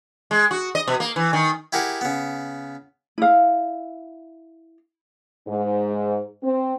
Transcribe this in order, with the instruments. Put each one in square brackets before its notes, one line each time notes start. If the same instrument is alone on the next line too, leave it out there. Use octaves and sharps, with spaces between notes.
[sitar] G#3
F#4
D#5
B2
A#3
E3
D#3
[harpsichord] E4 G4 G#4 A#4 F#5
C#3 B3
[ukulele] E4 F5
[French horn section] G#2
C4